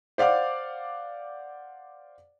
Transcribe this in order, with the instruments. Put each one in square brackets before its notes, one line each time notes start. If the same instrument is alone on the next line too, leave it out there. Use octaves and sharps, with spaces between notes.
[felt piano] C5 D5 F5 F#5 D6